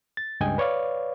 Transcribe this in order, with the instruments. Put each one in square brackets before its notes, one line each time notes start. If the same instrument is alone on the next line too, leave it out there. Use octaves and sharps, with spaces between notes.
[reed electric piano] A6
C#2 G2 D#5 G5 G#5
B4 C#5 D5 F5